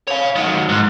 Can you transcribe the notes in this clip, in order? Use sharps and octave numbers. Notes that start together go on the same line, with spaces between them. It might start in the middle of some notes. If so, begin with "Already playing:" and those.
C#5 F5
D#3 F#3
G#2